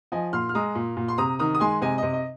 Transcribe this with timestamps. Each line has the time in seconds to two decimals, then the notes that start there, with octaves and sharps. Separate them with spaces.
0.12 F3 D#5 G#5
0.33 A#2 C6 F6
0.49 F6
0.55 G#3 A#5 D#6
0.75 A#2
0.97 A#2
1.08 C6
1.18 C3 A#5 D#6
1.39 D#3 A#5 D#6
1.55 D#6
1.60 G#3 G#5 C6
1.82 C3 D#5 G#5
1.98 C3 D#5
2.13 D#5